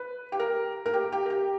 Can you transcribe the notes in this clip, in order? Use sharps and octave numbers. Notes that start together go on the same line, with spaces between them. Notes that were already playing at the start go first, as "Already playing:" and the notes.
Already playing: B4
G4
A#4
A#4
G4
G4
A#4
G4